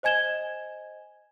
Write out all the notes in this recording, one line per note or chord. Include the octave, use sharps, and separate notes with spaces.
C5 D#5 G#5 G#6 E7 G7